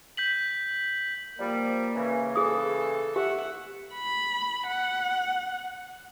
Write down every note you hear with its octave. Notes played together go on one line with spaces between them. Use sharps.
G6 B6 F#7
F3 G3 A#3
C#3 E3
G#4 A4 D#6
G4 E5 F#5
B5
F#5